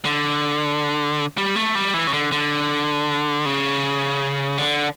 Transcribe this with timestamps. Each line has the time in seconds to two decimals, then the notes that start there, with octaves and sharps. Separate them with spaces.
0.05 D3
1.38 G3
1.56 A3
1.75 G3
1.94 E3
2.07 C#3
2.13 D3
2.32 D3
3.46 C#3
4.58 D3